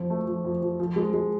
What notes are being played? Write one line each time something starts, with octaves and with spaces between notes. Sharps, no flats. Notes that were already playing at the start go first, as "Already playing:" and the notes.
Already playing: F2 F3
A3
F3
F2
F3
F3
G#3
G#3